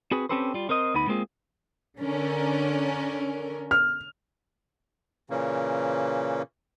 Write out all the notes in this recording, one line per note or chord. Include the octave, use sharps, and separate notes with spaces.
C4 F#4 G#4 B4
C4 C#4 G4 A4 B4 C5
G3 F4
C4 A#4 C5 D#5
D2 B3 D#4 B5
G#3 A#3 C4 F4 G#4
D3 C#4 A#4
F6
A#2 C#3 E3 A#3 C#4